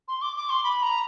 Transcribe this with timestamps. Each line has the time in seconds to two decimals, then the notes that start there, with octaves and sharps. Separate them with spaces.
0.08 C6
0.22 D6
0.36 D6
0.50 C6
0.64 B5
0.83 A#5